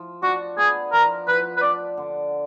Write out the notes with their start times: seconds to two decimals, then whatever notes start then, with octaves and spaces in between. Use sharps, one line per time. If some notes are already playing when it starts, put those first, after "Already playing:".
Already playing: F3
0.22 D4 F#4
0.58 B3 G#4
0.92 F3 A#4
1.27 F3 B4
1.57 B4
1.62 D4 D5
1.97 D3